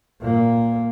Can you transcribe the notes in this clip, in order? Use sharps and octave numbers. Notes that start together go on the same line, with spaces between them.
A#2 A#3